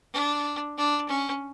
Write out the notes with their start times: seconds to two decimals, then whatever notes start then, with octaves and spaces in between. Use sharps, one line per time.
0.13 D4
0.77 D4
1.09 C#4